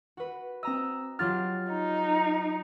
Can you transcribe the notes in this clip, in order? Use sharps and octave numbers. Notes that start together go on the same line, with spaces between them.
F#4 B4
C4 D#5 A#5 E6
F#3 F4 G4 F6 A6
D#4